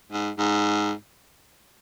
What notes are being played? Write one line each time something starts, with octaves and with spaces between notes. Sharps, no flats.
G#2
G#2